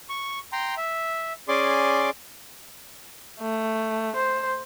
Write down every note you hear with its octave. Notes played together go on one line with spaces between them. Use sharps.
C#6
G5 A#5 C6
E5
C#4 G#4 D5 C6 D6
A3
C5